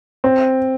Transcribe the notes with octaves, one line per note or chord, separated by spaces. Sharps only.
C4